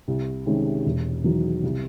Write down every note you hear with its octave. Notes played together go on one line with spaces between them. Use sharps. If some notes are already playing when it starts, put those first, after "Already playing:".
C2
C3 D#3 G#3 C#4
E1
E2 D#3 F#3
C2